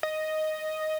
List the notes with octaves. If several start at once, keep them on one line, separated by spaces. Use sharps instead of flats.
D#5